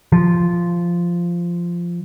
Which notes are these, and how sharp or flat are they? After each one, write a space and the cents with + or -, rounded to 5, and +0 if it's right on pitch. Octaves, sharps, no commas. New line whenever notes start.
F3 -10